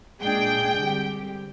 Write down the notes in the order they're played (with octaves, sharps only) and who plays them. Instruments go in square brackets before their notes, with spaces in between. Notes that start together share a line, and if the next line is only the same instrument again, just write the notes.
[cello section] A#2 G#3 D4 G#4 [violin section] G5
[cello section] D3 G3 C4 G4